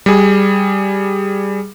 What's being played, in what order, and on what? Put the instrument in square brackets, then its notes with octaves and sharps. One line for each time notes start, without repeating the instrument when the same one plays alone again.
[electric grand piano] G3 G#4